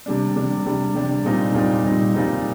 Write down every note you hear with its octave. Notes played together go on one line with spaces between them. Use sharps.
C3 G3 D4
C3 G3 D4
C3 G3 D4
C3 G3 D4
A#2 G3 C4 D#4
A#2 G3 C4 D#4
A#2 G3 C4 D#4
A#2 G3 C4 D#4